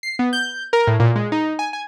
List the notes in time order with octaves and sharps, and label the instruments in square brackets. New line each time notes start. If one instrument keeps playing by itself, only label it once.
[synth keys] C7
B3
G6
A#4
A2
A#2
G#3
D#4
G#5
G#5